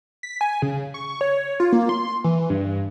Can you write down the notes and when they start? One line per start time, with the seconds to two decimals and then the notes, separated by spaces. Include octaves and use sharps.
0.23 B6
0.41 G#5
0.62 C#3
0.94 C#6
1.21 C#5
1.60 F4
1.72 A#3
1.89 C6
2.24 E3
2.50 G2